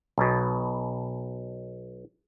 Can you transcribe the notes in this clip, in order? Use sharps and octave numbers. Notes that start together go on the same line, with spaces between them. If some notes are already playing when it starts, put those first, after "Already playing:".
B1 B2